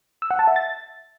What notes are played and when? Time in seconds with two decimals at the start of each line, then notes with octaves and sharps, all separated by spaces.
0.22 E6
0.31 F#5
0.39 A5
0.48 E5
0.56 A6